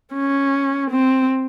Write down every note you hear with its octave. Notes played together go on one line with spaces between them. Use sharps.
C#4
C4